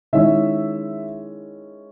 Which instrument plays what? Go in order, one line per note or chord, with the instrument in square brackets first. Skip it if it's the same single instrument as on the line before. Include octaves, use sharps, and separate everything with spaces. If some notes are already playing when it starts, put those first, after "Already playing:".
[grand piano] D#3 G#3 C#4 E4 E5